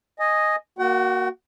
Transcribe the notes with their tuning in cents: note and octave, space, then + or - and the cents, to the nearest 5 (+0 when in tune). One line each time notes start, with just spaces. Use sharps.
D#5 +0 G#5 +0
A#3 +0 F#4 +0 F#5 +45